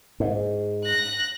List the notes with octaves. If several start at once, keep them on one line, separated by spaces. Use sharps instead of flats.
G#2
F#6 A#6